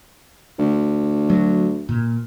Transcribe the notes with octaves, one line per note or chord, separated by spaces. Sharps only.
D2
F#3
A#2